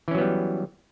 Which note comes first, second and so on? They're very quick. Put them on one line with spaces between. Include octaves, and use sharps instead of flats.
E3 C#4 F#3 B3 G3